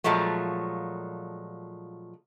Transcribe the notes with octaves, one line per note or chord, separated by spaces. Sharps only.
A#2 F3 F#3 G#3 A3